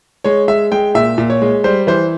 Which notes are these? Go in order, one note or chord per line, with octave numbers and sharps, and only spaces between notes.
G#3 C#5
G#3 E5
G#3 G5
A#2 E5
A#2
C#5
G#3
G3 C5
E3 C5